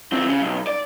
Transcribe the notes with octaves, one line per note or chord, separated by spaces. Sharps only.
E2 C4
C#3
B1
D5